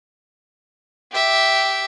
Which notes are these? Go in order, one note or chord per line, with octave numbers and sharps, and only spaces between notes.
G4 E5